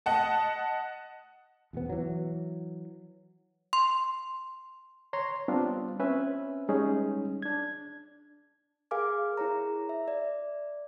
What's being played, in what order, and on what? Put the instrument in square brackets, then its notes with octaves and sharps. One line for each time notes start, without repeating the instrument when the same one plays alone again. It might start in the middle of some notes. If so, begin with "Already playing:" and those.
[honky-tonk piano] D#5 F#5 A5
[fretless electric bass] E2 B2 B3
E3 F#3
[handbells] C6
[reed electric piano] C#5 A#5 C6
G3 B3 C4 D4 F4
C4 C#4 B4 E5 G#5
G3 G#3 C#4 D#4 G#4
D4 G#6
[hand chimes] G#4 A#4 F5 G#5 D6 F6
E4 G#4 C#5 A#5
E5
D5